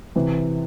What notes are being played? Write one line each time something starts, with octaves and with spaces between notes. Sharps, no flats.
C3 E3